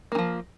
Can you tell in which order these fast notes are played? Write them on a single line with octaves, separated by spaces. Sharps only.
A#3 D#3 F3